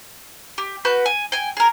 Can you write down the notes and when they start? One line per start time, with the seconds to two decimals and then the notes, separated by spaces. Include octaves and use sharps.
0.58 G4
0.85 F#4 B4 G6
1.06 G#5
1.32 G5 G#5
1.57 G#4 A#4